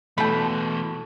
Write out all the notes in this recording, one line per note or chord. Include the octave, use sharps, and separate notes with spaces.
B2 E3 A3 G5 A5 B5